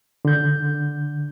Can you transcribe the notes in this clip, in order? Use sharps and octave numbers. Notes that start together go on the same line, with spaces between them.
D3 G6